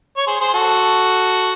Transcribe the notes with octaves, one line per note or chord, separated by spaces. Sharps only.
C#5
G#4 C5
G#4 C5
F#4 A4